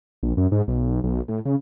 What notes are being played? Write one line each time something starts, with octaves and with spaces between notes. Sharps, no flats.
A#1
F#2
G#2
B1
B1
A2
C#3